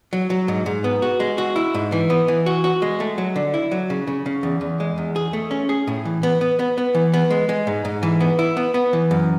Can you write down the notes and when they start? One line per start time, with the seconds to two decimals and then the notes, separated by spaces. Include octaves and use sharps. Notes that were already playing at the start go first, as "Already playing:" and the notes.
0.13 F#3
0.30 F#3
0.48 G#2
0.66 G#2
0.84 B3
1.02 F#4
1.20 G#3
1.38 F#4
1.56 E4
1.74 G#2
1.92 E3
2.10 B3
2.28 E3
2.46 F#4
2.64 F#4
2.82 G#3
3.00 A3
3.18 F#3
3.36 D3
3.54 E4
3.71 F#3
3.90 C#3
4.07 C#3
4.26 C#3
4.43 E2
4.61 E2
4.80 G#3
4.98 E2
5.16 G#4
5.33 A3
5.51 C#4
5.69 G#4
5.87 A2
6.05 E3
6.23 B3
6.41 B3
6.59 B3
6.78 B3
6.95 E3
7.14 B3
7.31 G#3
7.49 G#3
7.67 G#2
7.85 G#2
8.03 E3
8.21 B3
8.39 E4
8.57 B3
8.74 B3
8.93 E3
9.11 F#2